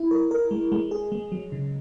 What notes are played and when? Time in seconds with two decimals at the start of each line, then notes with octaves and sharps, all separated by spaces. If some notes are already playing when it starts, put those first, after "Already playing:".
Already playing: E4
0.11 A#4
0.31 A#4
0.51 G#3
0.72 G#3
0.91 G#4
1.12 G#3
1.32 F#3
1.52 C#3